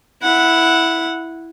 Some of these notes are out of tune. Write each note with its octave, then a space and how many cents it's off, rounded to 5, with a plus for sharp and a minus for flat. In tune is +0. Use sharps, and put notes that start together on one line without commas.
E4 +0 F#5 -10